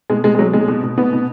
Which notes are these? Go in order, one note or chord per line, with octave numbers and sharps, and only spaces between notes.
B2 G#3
B2 G#3
G#3
B2 F#3
B2 G#3
B2
B2
B2 B3
B2